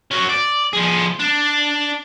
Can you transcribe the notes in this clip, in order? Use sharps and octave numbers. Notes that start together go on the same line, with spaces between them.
C#4 F#4
D5
F3 G#4
D4